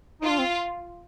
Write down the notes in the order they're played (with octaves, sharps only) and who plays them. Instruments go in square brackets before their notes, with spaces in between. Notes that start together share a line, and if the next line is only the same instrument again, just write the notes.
[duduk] D#4 [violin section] F4
[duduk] D4
C4